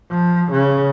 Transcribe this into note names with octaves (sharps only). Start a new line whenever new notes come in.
F3
C#3